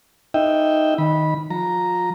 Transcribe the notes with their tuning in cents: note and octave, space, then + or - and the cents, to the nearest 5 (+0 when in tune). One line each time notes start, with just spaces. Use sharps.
D#4 +0 E5 +0 G5 +0
D#3 +0 B5 -15
F3 +30 A#5 +0